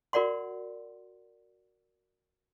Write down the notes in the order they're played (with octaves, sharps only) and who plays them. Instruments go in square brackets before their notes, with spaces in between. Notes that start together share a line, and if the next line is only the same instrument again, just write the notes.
[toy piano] F#4 A#4 D5 F#5 C6